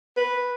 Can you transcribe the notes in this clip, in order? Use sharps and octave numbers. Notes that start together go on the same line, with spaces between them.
B4